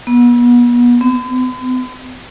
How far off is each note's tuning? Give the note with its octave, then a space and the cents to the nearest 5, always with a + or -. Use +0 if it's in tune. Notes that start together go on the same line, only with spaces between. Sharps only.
B3 -35
B3 +45